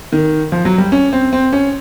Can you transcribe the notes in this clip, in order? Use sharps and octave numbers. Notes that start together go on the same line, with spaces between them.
D#3
F3
F#3
G3
C#4
C4
C4
C#4